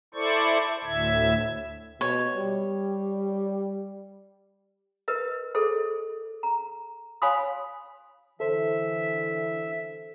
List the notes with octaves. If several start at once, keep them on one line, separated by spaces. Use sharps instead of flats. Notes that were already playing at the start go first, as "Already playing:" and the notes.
E4 A4 C5 D5 C#6
D2 A2 E5 G#6
B2 C#5
G3
A#4 B4 D#5
G#4 A4 C5 D#5
A#5
C#5 F5 G#5 B5 C6 D#6
D3 E3 A4 C5 E5